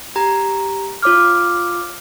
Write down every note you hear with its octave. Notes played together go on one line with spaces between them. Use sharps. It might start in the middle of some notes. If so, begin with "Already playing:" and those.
G4 A#5
F4 C#5 D6 F6